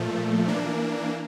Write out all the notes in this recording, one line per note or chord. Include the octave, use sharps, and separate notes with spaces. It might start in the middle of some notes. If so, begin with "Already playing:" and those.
Already playing: A#2 F3 A3
E3 A#3 D4